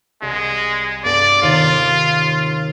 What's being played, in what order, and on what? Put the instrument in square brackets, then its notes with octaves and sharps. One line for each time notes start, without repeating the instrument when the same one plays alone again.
[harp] C2 [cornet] G#3
[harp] G2 B3 A4 [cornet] D5
[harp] D#2 C3 D#3 [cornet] F4